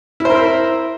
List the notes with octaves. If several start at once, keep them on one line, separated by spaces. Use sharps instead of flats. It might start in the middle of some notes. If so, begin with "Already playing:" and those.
E4 A#4 C5 E5